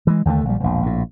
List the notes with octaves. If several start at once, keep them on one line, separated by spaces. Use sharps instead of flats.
E3 G#3
D#2 D3 D#3 A3
A#1 G3
E1 A#1
A#1 A2